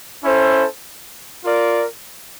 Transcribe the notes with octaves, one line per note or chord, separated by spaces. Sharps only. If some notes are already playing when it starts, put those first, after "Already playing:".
C#4 E4 A4 C5
F4 A#4 D5